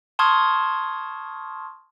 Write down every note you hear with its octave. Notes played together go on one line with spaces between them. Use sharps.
A5 C6 C#6 D#6 F6 G#6